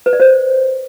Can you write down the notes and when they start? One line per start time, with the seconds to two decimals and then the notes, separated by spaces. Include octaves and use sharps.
0.06 B4
0.13 D5
0.20 C5